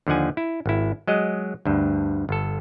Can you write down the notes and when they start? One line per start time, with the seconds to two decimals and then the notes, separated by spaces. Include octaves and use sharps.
0.07 D#2 D3 F3 F#5 G#5
0.37 E4
0.66 G#1 E4
1.07 F#3 G#3 D#5
1.65 D2 G2
2.29 G1 A4